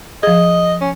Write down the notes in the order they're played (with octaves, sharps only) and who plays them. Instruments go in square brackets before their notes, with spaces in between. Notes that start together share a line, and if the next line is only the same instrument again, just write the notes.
[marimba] F3 G#4 [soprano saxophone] D#5
[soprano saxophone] C#4